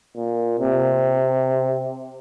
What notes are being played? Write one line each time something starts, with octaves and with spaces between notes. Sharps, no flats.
A#2
C3